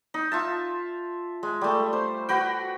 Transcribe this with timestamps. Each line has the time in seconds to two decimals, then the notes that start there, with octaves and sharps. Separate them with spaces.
0.14 D#4
0.32 F4 E5 A5
1.43 G#3
1.61 G3 A3
1.93 C5
2.29 F#4 B4 G5